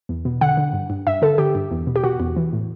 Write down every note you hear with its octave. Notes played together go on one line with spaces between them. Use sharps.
E2
B2
D3 F#5
D3
G2
G2
G2 E5
D3 A4
D3 G4
G2
E2
B2
G4
B2 F#4
E2
E3
A2